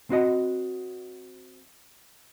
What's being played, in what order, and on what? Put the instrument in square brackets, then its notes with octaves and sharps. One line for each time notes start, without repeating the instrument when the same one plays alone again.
[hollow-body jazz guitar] C4 F#4 D#5